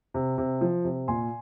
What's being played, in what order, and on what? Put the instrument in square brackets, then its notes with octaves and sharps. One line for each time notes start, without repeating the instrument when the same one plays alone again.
[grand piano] C3
C3
F3
C3
A#2 G#5 C6